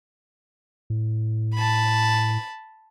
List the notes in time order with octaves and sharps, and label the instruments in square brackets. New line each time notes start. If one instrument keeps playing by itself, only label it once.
[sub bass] A2
[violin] A5 B5